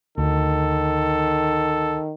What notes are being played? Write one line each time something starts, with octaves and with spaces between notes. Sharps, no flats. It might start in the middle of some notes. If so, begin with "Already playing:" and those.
D2 D#3 A4